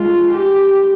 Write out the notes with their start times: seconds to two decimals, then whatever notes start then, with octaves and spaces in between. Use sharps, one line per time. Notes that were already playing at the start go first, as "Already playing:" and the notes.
Already playing: G#3 F4
0.33 G4